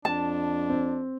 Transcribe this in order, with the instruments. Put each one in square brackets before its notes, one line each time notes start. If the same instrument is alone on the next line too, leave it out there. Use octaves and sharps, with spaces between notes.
[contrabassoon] F2 [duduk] D4 [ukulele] A5
[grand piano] C4